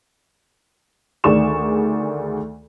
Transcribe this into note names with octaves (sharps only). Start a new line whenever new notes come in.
D2 D#3 G#4 D5 C#6 E7